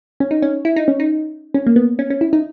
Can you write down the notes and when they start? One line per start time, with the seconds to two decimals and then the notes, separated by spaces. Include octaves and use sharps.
0.20 C#4
0.31 D#4
0.42 C#4
0.65 E4
0.76 D#4
0.88 C#4
1.00 D#4
1.54 C#4
1.66 A#3
1.76 B3
1.99 C#4
2.10 C#4
2.21 E4
2.33 D#4